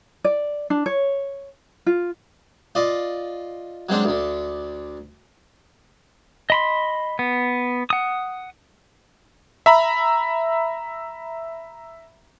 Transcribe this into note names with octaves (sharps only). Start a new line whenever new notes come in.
D5
D4
C#5
F4
F4 D5 D#5
F#3 G#3 C4 D4
D2 D3
D#5 B5 C6
B3
F#5 D#6
E5 A#5 B5